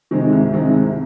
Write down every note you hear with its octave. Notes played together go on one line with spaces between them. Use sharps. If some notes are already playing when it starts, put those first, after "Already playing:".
C3 D#3 G#3 C4
C2
C3 D#3 G#3 C4
C2